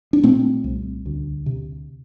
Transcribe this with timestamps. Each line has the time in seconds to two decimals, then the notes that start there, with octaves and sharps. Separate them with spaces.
0.13 D4
0.23 A#2 A3 C4
0.64 C2
1.06 D2
1.46 C3